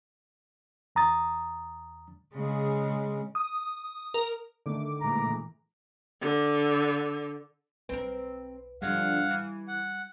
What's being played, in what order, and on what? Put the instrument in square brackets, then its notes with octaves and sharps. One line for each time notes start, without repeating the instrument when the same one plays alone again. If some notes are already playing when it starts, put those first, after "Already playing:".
[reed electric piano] E2 A#5 D#6 A6
[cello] C#3 G#3
[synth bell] D#6
A#4
[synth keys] D3 D#3 A3 [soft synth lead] D6
[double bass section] A#2 E3 G#3 [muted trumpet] A#5
[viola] D3
[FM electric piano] B1 B4 [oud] C4 A#4
[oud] G2 D3 F3 [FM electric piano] G3 G#6 [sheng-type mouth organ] F5 F#5
[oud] E3
[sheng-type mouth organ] F#5